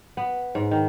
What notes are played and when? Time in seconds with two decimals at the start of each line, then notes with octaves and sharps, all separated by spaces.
0.17 B3
0.55 G#2
0.71 D#3